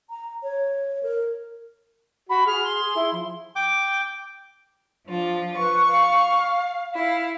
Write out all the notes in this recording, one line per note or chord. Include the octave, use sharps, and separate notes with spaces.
A#5
C#5
A#4
F#4 B5
G#4 F6
C6
G#4
E4
F3
G5 D6
F3 D4 F4
B4 C#6
F5
E4 F5